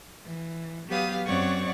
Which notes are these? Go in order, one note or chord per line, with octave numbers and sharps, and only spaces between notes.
E3
F#3 B3 G4 B4 F5 D#6
F#2 C4 C#5 D5 F#5 C#6